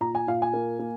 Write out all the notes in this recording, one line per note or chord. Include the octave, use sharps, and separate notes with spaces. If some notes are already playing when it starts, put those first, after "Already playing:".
A#2 A#5
G#5
A#2 F5
G#5
A#3
A#3